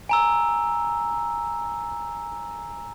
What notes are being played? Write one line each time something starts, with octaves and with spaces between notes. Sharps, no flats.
G#5 A#5 E6